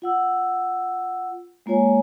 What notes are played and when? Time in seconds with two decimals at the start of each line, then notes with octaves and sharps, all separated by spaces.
0.02 F4 F#5 E6
1.66 G#3 A#3 F4 C#5 G#5